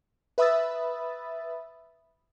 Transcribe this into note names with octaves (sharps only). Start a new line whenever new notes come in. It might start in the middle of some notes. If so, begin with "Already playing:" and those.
B4 E5 B5 D#6 E6 A6